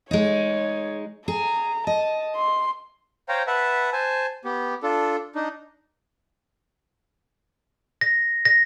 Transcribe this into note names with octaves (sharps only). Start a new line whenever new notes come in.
G#3 D#4 C#5
G#4 A#5
D#5 A5
C6
C5 C#5 F5 G5 A#5
B4 E5 F#5 A5
C5 G#5 A5
B3 G4
D4 F4 A4
D4 D#4
A#6
A#6